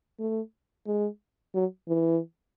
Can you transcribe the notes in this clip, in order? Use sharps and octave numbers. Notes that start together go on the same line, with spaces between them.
A3
G#3
F#3
E3